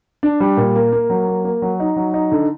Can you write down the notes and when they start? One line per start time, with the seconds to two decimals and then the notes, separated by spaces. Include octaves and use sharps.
0.23 D4
0.40 G3
0.57 A#2
0.75 A#3
0.92 A#3
1.10 F#3
1.27 A#3
1.44 A#3
1.62 F#3
1.80 D#4
1.96 F#3
2.14 D#4
2.32 D3